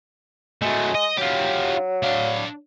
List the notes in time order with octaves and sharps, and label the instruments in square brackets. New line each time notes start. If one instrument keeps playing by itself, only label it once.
[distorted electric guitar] F#3 A3 [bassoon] G#3
[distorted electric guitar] D#5
[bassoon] F#3 [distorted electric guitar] F4 G4
[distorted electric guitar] D4 F5